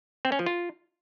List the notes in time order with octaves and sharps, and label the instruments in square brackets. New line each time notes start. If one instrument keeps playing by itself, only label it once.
[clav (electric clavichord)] C4
C#4
F3
F4